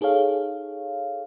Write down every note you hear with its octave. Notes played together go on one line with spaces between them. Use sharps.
D#4 G#4 A4 C#5 F5